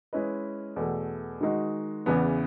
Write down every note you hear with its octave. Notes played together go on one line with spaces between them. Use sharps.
G#3 C#4 E4 B4 D#5
E2 B2 A3
D#3 G#3 D#4 F#4
E2 C#3 E3 B3